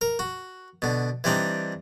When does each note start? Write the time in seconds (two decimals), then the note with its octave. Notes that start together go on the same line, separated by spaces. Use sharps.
0.01 A#4
0.19 F#4
0.82 B2 D3
1.24 E3 G3 C4 D4 D#4